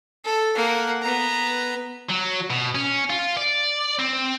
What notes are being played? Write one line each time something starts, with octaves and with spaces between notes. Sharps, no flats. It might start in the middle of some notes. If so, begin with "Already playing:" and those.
A4
A#3 F#5
B3 A#5
F#3
B2
C#4
F4
D5
C4